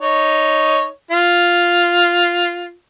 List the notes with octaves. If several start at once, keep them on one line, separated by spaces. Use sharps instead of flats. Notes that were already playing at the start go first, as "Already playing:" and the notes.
D#4 C#5
F4